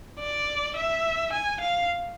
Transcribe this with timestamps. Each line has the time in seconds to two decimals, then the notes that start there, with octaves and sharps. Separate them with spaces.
0.20 D5
0.76 E5
1.33 G#5
1.61 F5